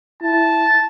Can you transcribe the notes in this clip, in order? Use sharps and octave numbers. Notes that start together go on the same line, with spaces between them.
E4 A5